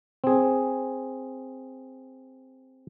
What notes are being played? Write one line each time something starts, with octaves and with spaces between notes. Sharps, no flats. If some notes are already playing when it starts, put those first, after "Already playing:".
C4 G#4